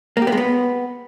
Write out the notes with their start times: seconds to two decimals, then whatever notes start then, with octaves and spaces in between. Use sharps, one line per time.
0.17 A#3
0.22 G4
0.27 B3
0.32 G#3
0.37 B3